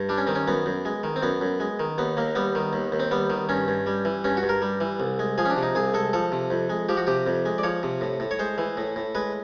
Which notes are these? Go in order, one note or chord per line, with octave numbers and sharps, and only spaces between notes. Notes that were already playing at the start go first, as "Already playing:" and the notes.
Already playing: G2
G3 D4
C#4
D#3 C4
C#4
F#2 B3
F#2
G#3
D#3
C4
F#2 B3
F#2
G#3
D#3
D#2 B3
D#2 A#3
G3 B3
D#3
D#2
D#2
C4
G3 B3
D#3
G2 C#4
G2
G3
E3
G2 C#4
F#4
G2
A#4
G3
E3
C2
G#3
F3 G#4
C#4
D4
C3
D#4
C2 G#4
G#3 A4
F3 A4
C3
F2
G#3
F3 G4
F#4
C3 G4
F2
G#3
D5
F3 C#5
C3
A2
A2
C#5
G#3 C5
E3
A2
A2
G#3 B4